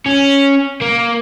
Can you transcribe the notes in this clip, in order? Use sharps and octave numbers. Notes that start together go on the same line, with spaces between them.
C#4
A#3